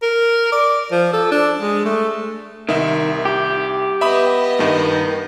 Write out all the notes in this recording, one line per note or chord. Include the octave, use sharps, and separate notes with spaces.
A#4
D5
F3
A4
D4
G#3
A3
C2 D#3 E5
G4
B3 D#5 E5 B5 D#6
G2 D#3